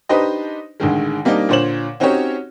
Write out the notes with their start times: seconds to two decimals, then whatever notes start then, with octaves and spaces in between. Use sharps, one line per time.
0.09 D4 D#4 G4 B4 C5 D#5
0.80 A1 D3 D#3 G#3
1.25 G3 A#3 C4 D4 D#4
1.49 A#2 D3 C5 C#5 E7 F#7
2.00 C4 C#4 D#4 F#4 G4 C#5